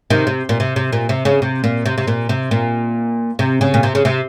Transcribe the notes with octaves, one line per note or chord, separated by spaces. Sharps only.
C3 D#3
C3
A#2
C3
C3
A#2
C3
C#3
C3
A#2
C3
C3
A#2
C3
A#2
C3
C#3
A#2
C3
C#3
C3